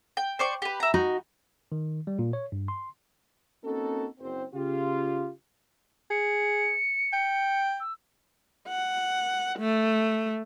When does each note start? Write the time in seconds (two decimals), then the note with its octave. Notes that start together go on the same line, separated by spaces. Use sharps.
0.17 G5
0.39 C5 D5 C#6
0.62 G4 B4
0.80 E5 A#5
0.94 D#4 F#4
1.72 D#3
2.07 G3
2.19 A#2
2.33 C#5
2.52 G2
2.68 C6
3.64 A#3 C4 C#4 D#4 F#4 A4
4.20 F#1 C4 C5
4.54 C#3 F4 G4
6.11 G#4 C#7
7.13 G5
7.80 E6
8.68 F#5
9.59 A3